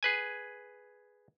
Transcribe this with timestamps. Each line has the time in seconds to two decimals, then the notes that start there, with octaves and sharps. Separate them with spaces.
0.03 G#4 B4 G#5